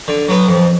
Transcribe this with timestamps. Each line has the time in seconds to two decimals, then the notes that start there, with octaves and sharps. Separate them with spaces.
0.08 D3
0.29 F#3 B3
0.49 F2